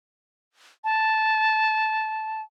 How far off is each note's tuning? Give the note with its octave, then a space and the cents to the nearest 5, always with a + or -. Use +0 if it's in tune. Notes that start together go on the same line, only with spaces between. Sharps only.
A5 -10